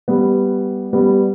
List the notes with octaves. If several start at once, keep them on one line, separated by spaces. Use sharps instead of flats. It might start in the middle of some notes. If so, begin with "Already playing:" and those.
G3 B3
G3 B3